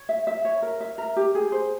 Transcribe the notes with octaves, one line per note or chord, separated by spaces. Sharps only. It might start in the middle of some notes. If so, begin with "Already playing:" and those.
Already playing: C#5
E5
E5
C#5
A#4
E5
A#4
G4
G#4
C5